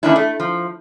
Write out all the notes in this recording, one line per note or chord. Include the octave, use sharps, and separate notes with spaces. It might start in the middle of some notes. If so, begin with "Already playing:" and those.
D#3 E3 A#3 C#4 D4 E4
A3
F3